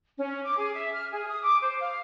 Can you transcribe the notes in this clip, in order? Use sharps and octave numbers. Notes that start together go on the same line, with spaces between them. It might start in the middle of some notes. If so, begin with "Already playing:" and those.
C#4
D6
G#4
E5
F6
G#4
D#6
D6
C5
F5